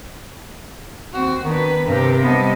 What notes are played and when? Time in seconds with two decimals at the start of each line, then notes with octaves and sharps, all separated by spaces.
1.13 D#2 C4 F#4
1.45 D#3 B3 D4 B4
1.88 G2 C3 G4 A#4
2.24 G3 B3 A4 D#5